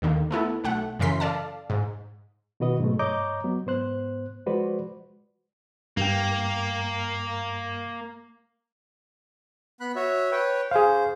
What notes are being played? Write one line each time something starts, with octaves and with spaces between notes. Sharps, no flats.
D#2 D3 D#3 A#3
A3 B3 E4 A4
B1 A3 F#5
F#2 C#3 E3 A#4 C6 B6
A4 D5 F5 A5
G#2
B2 D#3 F#4 B4 D#5
G#2 B2 F#3 G#3 A3
G2 C#5 D#5 A#5 D6 G6
F#3 B3
G#2 B3 C5 F#6
F3 G#3 F#4 B4 C5 D5
G2 A#3 G5
B3 B5 F#6
F#4 C#5 E5
B4 C#5 G5
G#4 C5 F5